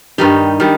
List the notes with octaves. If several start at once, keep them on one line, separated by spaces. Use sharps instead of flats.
G2 D#3 G3 D#4
D#3 G3